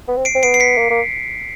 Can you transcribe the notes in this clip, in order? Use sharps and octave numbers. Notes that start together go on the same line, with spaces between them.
B3
C4
C7 D7
C4
B3 C7 D7
C7
B6 C#7
A#3
A#3